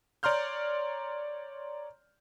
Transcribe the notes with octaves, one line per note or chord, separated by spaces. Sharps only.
C#5 D5 A#5 C6 F6 G6